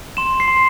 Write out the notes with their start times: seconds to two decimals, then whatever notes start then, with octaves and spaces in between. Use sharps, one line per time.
0.17 C6 E7
0.40 C7
0.48 C6